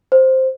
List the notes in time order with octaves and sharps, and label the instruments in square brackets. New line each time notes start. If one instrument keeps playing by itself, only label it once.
[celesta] C5